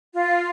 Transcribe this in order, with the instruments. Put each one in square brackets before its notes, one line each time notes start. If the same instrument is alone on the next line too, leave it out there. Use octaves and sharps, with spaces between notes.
[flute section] F4